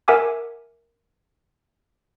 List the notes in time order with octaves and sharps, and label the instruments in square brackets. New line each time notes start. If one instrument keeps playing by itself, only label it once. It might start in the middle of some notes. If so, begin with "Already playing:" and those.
[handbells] A#4 E5 F#5 G#5 D6 E6